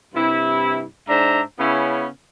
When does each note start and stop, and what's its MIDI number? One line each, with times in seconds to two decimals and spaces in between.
0.15 0.84 43
0.15 0.84 48
0.15 0.84 64
1.08 1.41 44
1.08 1.41 62
1.08 1.41 72
1.08 1.41 76
1.08 1.41 82
1.59 2.07 49
1.59 2.07 59
1.59 2.07 61
1.59 2.07 64